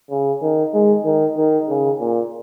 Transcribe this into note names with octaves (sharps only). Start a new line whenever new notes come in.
C#3
D#3
G#3
D#3
D#3
C#3
A#2